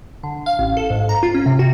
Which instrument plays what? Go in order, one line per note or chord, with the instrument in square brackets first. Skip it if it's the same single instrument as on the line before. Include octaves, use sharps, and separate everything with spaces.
[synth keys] D3
F5
A1
A4
G#2
A#5
F4
C#4
C3
F#4